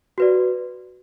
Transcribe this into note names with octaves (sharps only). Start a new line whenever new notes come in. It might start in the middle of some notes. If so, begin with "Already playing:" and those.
F#4 B4 D5